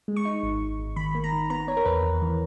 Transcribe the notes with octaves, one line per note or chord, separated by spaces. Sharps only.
G#3
C#6
D#4
G#1
G#1
G#1
D#3 B5
A#3
A#5
D#3
B3 A#5
B3 C#5
A#4
E2 B4
E2
E3